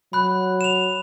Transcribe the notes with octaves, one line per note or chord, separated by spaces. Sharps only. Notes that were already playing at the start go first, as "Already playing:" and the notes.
F#3 B5 F#6
E7 F7